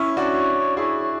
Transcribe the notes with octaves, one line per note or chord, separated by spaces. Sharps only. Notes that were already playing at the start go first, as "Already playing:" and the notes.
Already playing: C#4 E4 C#5
D4 F#4
E4 G#4 C#5